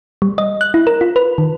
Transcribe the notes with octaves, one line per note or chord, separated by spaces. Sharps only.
G3
D#5
F#6
E4
A#4
F4
B4
D#3